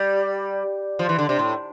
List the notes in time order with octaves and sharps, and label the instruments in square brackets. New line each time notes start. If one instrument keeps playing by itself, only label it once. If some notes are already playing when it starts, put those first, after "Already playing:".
Already playing: [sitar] G3
F3
E3
D3
C3
A2